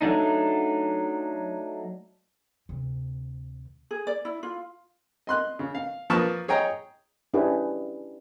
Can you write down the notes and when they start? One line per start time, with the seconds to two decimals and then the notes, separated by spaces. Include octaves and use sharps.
0.01 F#3 A3 D4 D#4
2.69 D2 C3
3.91 G#4
4.07 D5
4.25 E4
4.43 F4
5.27 D#5 C6 F#6
5.59 C#3
5.75 F5
6.10 F3 A#3 B4 A5 C#6 D#6
6.48 G#4 C#5 D#5 G5 A#5
7.34 C#4 D4 E4 G4 G#4 B4